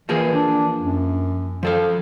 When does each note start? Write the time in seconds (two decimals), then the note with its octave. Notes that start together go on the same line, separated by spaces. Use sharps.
0.09 E3 F3 A#3 G#4
0.35 D4
0.78 F#2
1.63 F3 A4 F5